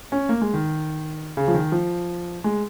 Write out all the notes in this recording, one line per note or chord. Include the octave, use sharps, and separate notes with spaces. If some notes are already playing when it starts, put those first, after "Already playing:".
C#4
A#3
G#3
D#3
C#3
F3
D#3
F3
G#3